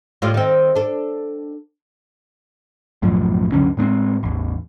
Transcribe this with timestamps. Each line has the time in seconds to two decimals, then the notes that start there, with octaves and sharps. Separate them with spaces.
0.22 A2 G3 F4
0.34 D#3 C4
0.75 D4 A4
3.02 B1 F#2 A2 F3
3.52 C#2 F#2 D3 C#4
3.77 A2 G#3 B3 C4
4.23 A1 E2